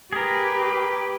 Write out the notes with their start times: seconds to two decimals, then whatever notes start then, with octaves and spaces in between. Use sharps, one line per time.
0.13 G4 G#4 A#4 B4